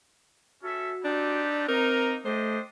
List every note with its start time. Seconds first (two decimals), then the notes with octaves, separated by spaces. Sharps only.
0.64 C#4 F#4 A4 E5
1.04 C4 D4 D#4 G4
1.68 A#3 C4 D#4 A#4
2.25 A3 D4 G4 C5 D#5